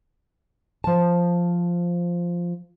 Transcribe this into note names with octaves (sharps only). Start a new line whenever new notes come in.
F3 A5